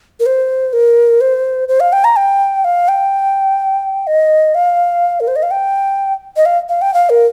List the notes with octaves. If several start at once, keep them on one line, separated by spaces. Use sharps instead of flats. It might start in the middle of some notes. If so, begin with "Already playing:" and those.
A#4
C5
A#4
C5
C5
F5
G5
A#5
G5
F5
G5
D#5
F5
A#4
C5
D#5
F5
G5
D#5
F5
F5
G5
F5
A#4